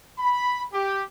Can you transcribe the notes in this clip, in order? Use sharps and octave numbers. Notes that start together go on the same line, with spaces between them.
B5
G4